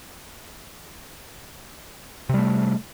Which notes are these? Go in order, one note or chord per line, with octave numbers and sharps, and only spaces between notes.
C3 G3 A3